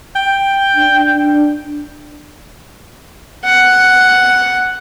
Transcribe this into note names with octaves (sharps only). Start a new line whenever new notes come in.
G5
D4
F#5